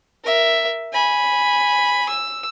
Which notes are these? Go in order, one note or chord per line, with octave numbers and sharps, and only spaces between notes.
A#4 E5
G#5 B5
E6